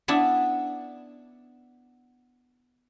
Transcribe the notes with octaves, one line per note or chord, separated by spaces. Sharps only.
B3 D4 E4